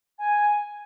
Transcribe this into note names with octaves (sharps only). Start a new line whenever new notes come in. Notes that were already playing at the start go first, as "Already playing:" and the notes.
G#5